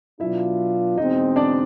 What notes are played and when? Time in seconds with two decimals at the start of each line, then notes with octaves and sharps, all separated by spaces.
0.20 B2 F#3 B3 D4 E4 F4 E5
0.98 E2 B2 G#3 C4 D#4 D#5
1.36 D4 D5